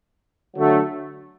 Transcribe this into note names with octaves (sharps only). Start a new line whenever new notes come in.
D3 F#3 A3